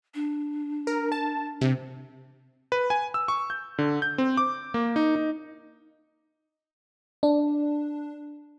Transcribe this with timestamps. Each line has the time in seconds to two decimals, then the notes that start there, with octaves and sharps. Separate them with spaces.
0.15 D4
0.87 A#4
1.12 A5
1.61 C3
2.72 B4
2.90 G#5
3.14 E6
3.28 C#6
3.50 G6
3.78 D3
4.02 G6
4.18 C4
4.37 D6
4.74 A#3
4.96 D#4
5.16 D#4
7.23 D4